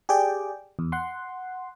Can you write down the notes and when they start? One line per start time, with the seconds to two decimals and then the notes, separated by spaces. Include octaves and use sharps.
0.09 G4 G#4 D5 G5
0.79 E2
0.92 F#5 C6